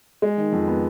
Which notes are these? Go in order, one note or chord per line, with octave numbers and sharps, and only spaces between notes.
G#3
D#3
F2
B3